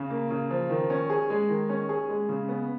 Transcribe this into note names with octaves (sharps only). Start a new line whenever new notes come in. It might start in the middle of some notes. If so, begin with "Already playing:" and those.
Already playing: C#3
A#3
C#3
F3
D#3
C#4
G#4
G#3
D#3
C#4
G#4
G#3
C#3
B3